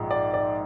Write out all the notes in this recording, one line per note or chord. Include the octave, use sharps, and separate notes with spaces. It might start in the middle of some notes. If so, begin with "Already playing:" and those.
Already playing: A#1 G#2 F3 G#3
D5
D5